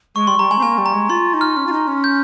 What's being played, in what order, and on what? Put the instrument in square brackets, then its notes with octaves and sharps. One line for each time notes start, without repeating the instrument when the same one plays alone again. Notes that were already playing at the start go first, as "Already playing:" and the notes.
[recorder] G#3 [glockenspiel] C#6
[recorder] G3 [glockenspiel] C6
[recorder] G3 [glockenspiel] A#5
[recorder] G#3 [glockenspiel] G#5
[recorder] C4
[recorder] A#3 [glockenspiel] G#5
[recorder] G3
[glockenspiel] A#5
[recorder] G#3
[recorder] F4 [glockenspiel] C6
[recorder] D#4
[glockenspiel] F6
[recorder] C#4
F4
D#4
C#4
[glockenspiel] G6